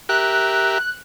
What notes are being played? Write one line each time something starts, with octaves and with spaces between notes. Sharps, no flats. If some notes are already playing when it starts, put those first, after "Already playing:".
G4 A#4 E5 F#6